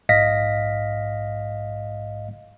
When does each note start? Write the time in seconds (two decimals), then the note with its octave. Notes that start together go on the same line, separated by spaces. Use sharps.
0.09 A#1 G#2 D#5 F5 A#6 B6